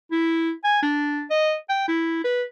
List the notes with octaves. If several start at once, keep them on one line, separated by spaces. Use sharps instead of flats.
E4
G#5
D4
D#5
G5
E4
B4